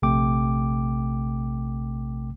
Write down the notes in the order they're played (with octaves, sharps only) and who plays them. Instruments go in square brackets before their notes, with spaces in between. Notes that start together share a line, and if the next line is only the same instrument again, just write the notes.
[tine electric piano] A#1 C3 A3 G5 D6